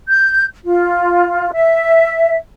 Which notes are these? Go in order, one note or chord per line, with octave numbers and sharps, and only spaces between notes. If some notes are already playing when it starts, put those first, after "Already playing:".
G6
F4
E5